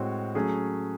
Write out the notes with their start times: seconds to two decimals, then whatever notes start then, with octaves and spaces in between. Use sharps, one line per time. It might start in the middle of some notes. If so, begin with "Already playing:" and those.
Already playing: A2 G#3 C4 F#4 C#5
0.35 F#3 A3 C#4 G#4